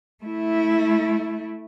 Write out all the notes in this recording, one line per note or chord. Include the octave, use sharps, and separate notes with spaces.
A3 E4